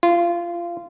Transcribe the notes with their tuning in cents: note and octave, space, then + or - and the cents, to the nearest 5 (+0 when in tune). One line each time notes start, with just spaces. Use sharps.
F4 -20